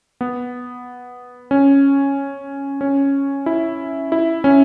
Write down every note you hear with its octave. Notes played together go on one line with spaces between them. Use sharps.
B3
C#4
C#4
E4
E4
C#4